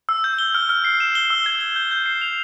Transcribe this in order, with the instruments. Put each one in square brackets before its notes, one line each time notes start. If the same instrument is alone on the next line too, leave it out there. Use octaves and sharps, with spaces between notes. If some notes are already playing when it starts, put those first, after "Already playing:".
[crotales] E6
G6
G7
F6
F6
C7
E7
G7
E6
G#6
G7
G6
G6
C7
F7